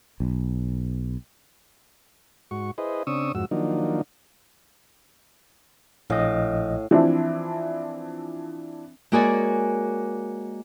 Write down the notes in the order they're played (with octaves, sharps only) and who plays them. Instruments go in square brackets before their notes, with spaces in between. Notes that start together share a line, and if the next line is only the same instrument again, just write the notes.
[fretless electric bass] B1
[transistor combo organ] G#2 F#4 C#6
E4 G#4 B4 C5 D#5
C#3 C4 D4 C#6 D#6 E6
F2 G#2 F#4 E6
D#3 F3 F#3 A#3 D4 D#4
[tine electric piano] A#1 D#5 [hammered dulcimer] A2 F5 G#5
[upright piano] E3 F3 C4 D4 E4
[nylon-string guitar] G#3 A#3 F#4 G#4 C#5 D5